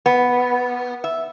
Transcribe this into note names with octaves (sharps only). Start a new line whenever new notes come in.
B3
E5